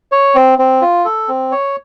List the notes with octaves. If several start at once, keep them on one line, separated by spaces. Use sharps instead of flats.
C#5
C4
C4
F4
A4
C4
C#5